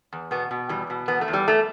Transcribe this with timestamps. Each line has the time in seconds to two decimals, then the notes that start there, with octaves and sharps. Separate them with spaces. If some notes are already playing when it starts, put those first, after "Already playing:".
0.13 E2
0.31 B2 B3
0.51 B2
0.69 E2 G3
0.90 B2
1.08 E2 B3
1.21 A3
1.28 E2
1.33 G3
1.47 E2 A3